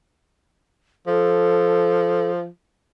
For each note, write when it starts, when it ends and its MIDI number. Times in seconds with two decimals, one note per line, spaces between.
1.07 2.46 53
1.07 2.31 69